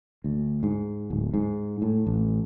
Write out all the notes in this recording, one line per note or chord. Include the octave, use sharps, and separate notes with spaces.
D2
G#2
D1
G#2
A2
A1